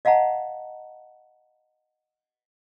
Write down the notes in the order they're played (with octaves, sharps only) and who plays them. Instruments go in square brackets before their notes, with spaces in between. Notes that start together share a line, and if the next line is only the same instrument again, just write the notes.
[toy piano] D#5 F5 F#5 A5 A#5